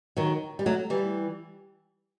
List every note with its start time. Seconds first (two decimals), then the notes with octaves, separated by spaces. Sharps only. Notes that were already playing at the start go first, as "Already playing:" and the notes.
0.17 D#3 F#3
0.59 G3
0.66 F#3 A3
0.90 E3 G3